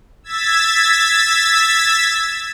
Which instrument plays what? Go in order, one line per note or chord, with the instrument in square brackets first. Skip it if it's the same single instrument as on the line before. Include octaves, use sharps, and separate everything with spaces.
[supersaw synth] E6 G#6 A6 B6